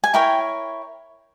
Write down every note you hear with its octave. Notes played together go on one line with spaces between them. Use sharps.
G#5
E4 A#4 C#5 G5